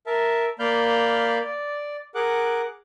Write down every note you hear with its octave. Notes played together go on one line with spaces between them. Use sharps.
A#4 E5 A5
A#3 D5 F5 B5 F6 G6
D5
G#4 A#4 F#5 D6 F#6